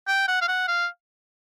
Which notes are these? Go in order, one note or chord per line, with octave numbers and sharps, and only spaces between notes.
G5
F#5
F5
F#5
F5